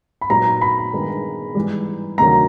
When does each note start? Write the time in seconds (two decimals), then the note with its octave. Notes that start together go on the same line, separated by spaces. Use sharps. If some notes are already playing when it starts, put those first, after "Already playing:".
0.21 B5
0.29 A#2 F#3 B3 D#4 G4 A#5
0.61 B5
0.93 G2 D#3 G#3 B3
1.55 G#2 E3 G3
2.18 D2 C3 D#3 F#3 A#5